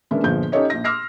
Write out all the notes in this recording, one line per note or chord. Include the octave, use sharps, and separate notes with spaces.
E3 G#3 A#3 C#4 D4 E4
G1 A#2 F3 G#4 G6
C#4 D#4 G4 A4 C#5 D#5
A#1 A#6
C6 D6 E6 F6 A#6 C7